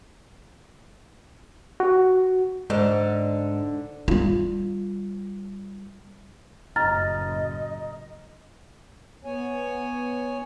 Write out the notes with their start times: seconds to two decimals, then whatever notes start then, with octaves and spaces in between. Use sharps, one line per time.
1.80 F#4
2.70 G#2 D3 G#3
4.08 G3 F4
6.76 F#1 A2 D#5 A#5 F6 A6
9.25 B3 C#5 G#5